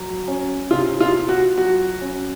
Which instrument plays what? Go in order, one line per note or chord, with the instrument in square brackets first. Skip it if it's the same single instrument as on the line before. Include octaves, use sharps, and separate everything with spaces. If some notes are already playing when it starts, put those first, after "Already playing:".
Already playing: [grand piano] F#3
C#4
[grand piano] C3 [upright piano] F4
[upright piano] F4
[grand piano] F4
[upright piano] F#4
[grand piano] F#3 [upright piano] F#4
[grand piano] C#4